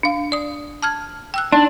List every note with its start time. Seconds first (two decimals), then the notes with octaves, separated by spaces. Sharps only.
0.03 D4 F5
0.32 D5 D#6
0.83 A5 F6 G#6
1.34 G5 E6 F#6
1.52 D4 D#4